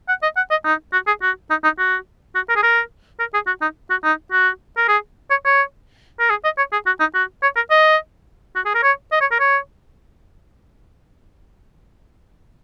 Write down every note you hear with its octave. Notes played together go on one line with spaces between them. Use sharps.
F#5
D#5
F#5
D#5
D#4
F#4
G#4
F#4
D#4
D#4
F#4
F#4
A#4
G#4
A#4
A#4
G#4
F#4
D#4
F#4
D#4
F#4
A#4
G#4
C#5
C#5
A#4
G#4
D#5
C#5
G#4
F#4
D#4
F#4
C#5
A#4
D#5
F#4
G#4
A#4
C#5
D#5
C#5
A#4
C#5